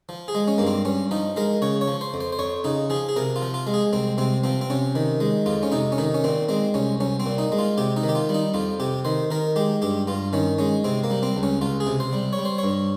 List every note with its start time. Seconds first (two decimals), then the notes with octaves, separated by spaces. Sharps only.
0.09 F3
0.28 G#4
0.35 G#3
0.48 C#4
0.58 G2 A#3
0.67 C4
0.85 G2 C#4
1.11 F3 D#4
1.36 G#3 A#4
1.62 C#3 C#5
1.81 C#5
1.88 F3
2.01 C5
2.14 F2
2.21 C5
2.33 C5
2.39 F2 C#5
2.64 C#3 D#4
2.90 F3 G#4
3.09 G#4
3.16 C3 A#4
3.36 F4
3.42 F3
3.54 F4
3.67 G#3
3.74 G#4
3.93 C2 C4
4.18 C3 C4
4.44 F3 C4
4.61 C4
4.70 C3 C#4
4.95 D#3
5.20 G#3
5.46 F2 F4
5.63 C#4
5.72 C3 D#4
5.92 C#4
5.98 D#3 D#4
6.14 C#4
6.24 A#2 C4
6.49 G#3 C4
6.74 C2 C#4
7.00 C2 C#4
7.20 C4
7.26 A#2
7.38 D#4
7.52 G#3
7.59 F4
7.78 C3 G4
7.96 D#4
8.03 D#3
8.09 G4
8.15 F4
8.29 G3
8.34 D#4
8.54 F2 F4
8.80 C3 G4
9.05 D#3 C5
9.31 D#3 A#4
9.56 G#3 G4
9.82 G2 G4
10.08 G2 F4
10.33 D#3 C#4
10.58 G#3 C#4
10.84 C3 C4
11.04 A#3
11.10 G3
11.23 C4
11.37 C#2
11.43 C#4
11.61 C#2 F4
11.80 G#4
11.87 C3
12.00 C5
12.13 G3
12.33 C#5
12.39 G3
12.45 C5
12.58 C#5
12.63 G2